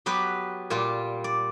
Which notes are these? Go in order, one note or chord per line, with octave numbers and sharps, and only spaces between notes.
F#3 B3 G4 B4
A#2 G3 F4
D5